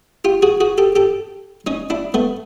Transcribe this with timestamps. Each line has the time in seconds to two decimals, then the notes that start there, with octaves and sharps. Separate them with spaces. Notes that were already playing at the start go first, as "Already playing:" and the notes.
0.25 F4 G4
0.42 F#4 G#4
0.60 F#4 G#4
0.78 G4 A4
0.96 G4 A4
1.67 C#4 D#4
1.90 D4 E4
2.14 A3 B3